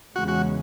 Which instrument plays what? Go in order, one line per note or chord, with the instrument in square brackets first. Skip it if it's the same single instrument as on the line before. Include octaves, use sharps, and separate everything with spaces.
[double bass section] E2 C#3 G#3 C#4 [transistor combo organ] F#4
[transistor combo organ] F#4